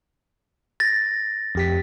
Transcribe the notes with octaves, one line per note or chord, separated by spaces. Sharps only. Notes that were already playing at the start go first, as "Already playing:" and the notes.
A6 A#6
F2 G4 B6